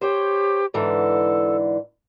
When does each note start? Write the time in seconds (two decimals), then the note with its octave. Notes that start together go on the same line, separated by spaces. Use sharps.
0.01 G4 C5 C#5
0.74 G#2 D3 E3 A4